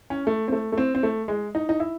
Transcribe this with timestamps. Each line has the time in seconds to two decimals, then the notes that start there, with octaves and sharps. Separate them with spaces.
0.10 C#4
0.27 A3
0.48 C4
0.52 A3
0.72 A3
0.78 C4
0.95 C4
1.03 A3
1.28 G#3
1.55 D#4
1.69 D#4
1.80 E4